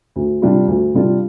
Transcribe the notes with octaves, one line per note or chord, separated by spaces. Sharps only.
D2
C3 G3 D4 F4
D2
C3 G3 D4 F4